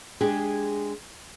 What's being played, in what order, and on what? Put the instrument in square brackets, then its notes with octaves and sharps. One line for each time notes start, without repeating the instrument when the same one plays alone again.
[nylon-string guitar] G#3 D4 G4 G#4